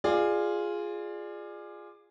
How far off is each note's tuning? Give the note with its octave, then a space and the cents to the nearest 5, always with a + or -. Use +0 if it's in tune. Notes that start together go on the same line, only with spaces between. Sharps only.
F4 +0 G#4 -5 D5 +25